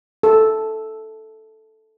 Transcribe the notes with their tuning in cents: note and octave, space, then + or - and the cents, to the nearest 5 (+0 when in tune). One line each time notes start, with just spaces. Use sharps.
A4 -5